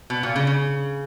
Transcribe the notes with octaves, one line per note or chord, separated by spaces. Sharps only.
B2
A#2
C#3
C#3